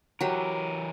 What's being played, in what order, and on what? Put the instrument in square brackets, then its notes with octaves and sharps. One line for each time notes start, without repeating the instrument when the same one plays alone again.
[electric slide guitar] E3 A#4 [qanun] F#3 G4